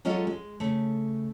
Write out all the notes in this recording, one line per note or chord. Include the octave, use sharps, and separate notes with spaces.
F#3 G#3 C#4 F4 A4 D#5
G#3
C#3 A3